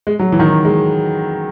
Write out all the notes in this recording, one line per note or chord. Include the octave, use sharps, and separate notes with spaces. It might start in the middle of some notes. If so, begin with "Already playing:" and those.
G#3
F#3
E3
D#3
E3
G#3